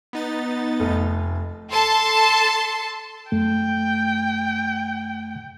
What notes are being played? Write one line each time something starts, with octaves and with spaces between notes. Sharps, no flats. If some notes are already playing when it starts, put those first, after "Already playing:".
B3 D#4 A6
F1 A3
A4 A5 C6
F#2 A3 G5